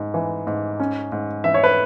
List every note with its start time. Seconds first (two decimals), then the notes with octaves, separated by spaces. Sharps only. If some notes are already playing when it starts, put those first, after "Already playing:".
Already playing: G#2
0.14 E3
0.47 G#2
0.80 C#4
1.12 G#2
1.44 E3 E5
1.54 C#5
1.64 B4